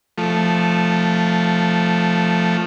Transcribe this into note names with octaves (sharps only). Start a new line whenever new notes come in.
F3 A3